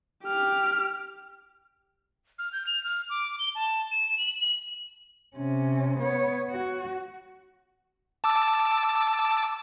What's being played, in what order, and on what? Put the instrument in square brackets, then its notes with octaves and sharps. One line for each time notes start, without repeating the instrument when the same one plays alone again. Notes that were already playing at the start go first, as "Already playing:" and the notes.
[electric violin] G4 F6
[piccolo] F6
G6
F7
F6
D6
G7
A5
E7
F#7
F#7
[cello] C3 C#4
B3 C#5
F#4
[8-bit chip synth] A5 D6 E6